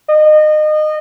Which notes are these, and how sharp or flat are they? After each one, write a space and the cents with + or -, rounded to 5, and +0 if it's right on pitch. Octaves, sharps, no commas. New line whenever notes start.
D#5 -25